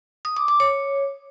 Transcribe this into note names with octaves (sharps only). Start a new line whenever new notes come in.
D#6
D6
D6
C#5